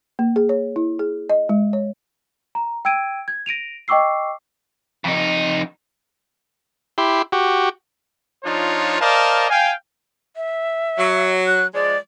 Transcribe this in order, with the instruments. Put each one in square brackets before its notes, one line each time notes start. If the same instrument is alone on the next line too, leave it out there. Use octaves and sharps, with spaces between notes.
[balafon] A#3
G#4
C#5
E4
G#4
D#5
G#3
C#5
[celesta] A#5
G5 E6 G#6 D7 D#7
G#6
A#6 D7 D#7 F7
D#5 G5 C#6 D6 E6 C7
[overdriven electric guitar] F2 D#4
[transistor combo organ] E4 G4 C6
F#4 G4
[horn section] F3 D4 D#4 F4 C#5
A#4 C5 D5 D#5 F5 A5
F5 G5 G#5
[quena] E5
[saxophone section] F#3
[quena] F#6
[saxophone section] F3 G#3 [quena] D5